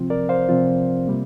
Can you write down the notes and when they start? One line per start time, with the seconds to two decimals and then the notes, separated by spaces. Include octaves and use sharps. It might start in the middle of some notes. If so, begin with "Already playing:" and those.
Already playing: C3 F3 C4 F4
0.10 A#4 D5
0.29 C5 F5
0.49 C3 F3 C4 F4
1.07 C3 G3 A#3